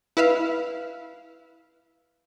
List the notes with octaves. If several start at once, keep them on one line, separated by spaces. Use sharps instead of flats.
E4 B4 E5 F5